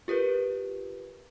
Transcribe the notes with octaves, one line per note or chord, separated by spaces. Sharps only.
F4 G4 A#4 B4